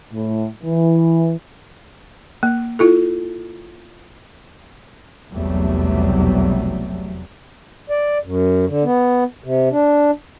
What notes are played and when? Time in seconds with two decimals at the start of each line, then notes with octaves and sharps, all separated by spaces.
0.12 A2
0.62 E3
2.43 A#3
2.79 E4 F4 A4
5.33 F1 B1 E2 F#3 G3 A3
7.90 D5
8.24 F#2
8.67 D3
8.83 B3
9.44 C3
9.71 D4